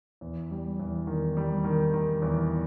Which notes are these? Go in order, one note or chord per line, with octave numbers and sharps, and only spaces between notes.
E2
G3
E2
D#3
G3
D#3
D#3
E2